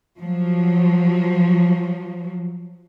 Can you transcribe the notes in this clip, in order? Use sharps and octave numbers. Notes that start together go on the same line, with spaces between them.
F3 F#3